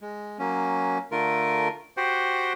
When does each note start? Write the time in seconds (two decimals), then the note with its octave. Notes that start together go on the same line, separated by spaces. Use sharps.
0.01 G#3
0.39 F#3 A#3 C#4
1.11 D3 A3 F4 A#4
1.97 F#4 G4 C5 F#5 G5